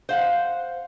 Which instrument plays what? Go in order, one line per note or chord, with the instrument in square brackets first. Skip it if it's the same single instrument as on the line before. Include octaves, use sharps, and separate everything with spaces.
[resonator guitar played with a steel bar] C5 F5 F#5